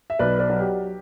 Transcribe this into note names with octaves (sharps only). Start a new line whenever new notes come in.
E5
B1 B4 D5
B4 D5
F#3
G4